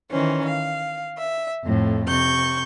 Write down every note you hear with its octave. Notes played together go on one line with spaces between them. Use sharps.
D#3 E3 C#4 C5
F5
E5
F2 A2
C3 C#6 G6